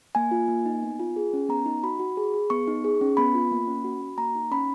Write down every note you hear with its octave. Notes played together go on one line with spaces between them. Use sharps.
A#3 G#5
F4
A#3
D#4
B3
F4
G#4
C#4
B3 A#5
D#4
F#4 B5
F#4
G#4
G#4
B3 C#6
D#4
G#4
C#4
B3 B5
F4
A#3
C#4
F#4
F#4
A#3 A#5
D#4
C#4 B5